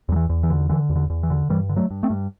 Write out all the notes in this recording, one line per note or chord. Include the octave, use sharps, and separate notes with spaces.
E2 F#3
E3
E2
E3
D3
D3 E3
E2
D3
E2
E3
D3
G2 E3 G3
D3
F#3 A3
G2
A3 C4
G2